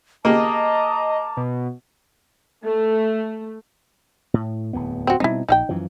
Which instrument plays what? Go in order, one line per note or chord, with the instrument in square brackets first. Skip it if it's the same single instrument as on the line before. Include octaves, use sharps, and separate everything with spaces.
[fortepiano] A#3 G4 G#4 [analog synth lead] D#5 [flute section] A5 A#5 D6
[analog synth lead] B2
[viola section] A3
[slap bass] A2
D1 E2 B3
[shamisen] C4 F#4
[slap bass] B2 G3 C4 [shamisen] D#4 E4
[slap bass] A#1 [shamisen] D#4 F5 G5
[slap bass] F#2 E3 F3